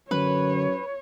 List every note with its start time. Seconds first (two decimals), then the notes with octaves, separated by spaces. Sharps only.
0.11 F#2 D3 B4 C#5